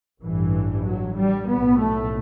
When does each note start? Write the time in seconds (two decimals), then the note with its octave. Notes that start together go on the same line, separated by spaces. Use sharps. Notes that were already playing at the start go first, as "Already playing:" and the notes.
0.22 A1 G2 E3
0.85 F#3
1.17 G3
1.47 B1 A2 B3
1.79 A3